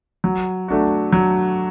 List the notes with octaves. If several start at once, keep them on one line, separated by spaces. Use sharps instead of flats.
F#3
A3 D4 F#4
F#3